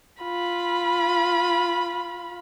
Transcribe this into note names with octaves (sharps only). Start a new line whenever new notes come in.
F4 B5